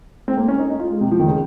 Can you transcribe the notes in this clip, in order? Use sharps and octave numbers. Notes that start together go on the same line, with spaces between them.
C4
A#3
C#4
D#4
D#4
F4
G#3
C3
F3
D#3
C#3